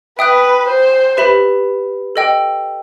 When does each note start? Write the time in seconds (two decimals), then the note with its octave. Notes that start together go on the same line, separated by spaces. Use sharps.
0.19 B4 E5 G5 D#6 F#6
0.68 C5
1.17 G4 B4 E5 B5
2.16 A4 D#5 G5